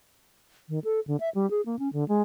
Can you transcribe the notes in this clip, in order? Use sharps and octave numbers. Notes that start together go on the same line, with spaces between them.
D#3
A4
D3
E5
G3
G#4
A#3
C#4
D3
G#3